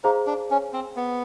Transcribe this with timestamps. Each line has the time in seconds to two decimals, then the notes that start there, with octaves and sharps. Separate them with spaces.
0.04 D#4 G#4 C5 F5 A#5
0.27 D4
0.50 C#4
0.73 C4
0.96 B3